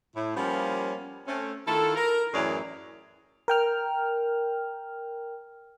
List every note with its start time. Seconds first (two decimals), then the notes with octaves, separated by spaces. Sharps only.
0.16 A2 E4
0.36 F3 G3 A#3 B3 C#4
1.28 A3 C4 C#4
1.67 D#3 E4 F4 A4
1.96 A#4
2.34 F#2 A2 E3 G#4 C#5 D5
3.48 A#4 G5 F6